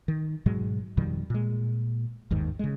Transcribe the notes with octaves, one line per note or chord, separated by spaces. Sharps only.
D#3
G#2 B2 F#3 G#3
F2 B2 D#3 G3
A#2 G#3
G1 D#2 G#2 D#3
C#3 G#3